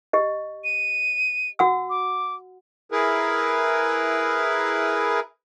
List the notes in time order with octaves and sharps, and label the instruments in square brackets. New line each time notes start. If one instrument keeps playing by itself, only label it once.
[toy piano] G4 D#5
[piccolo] D#7
[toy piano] F#4 F#5 E6
[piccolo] D6
[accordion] E4 G#4 A#4 B4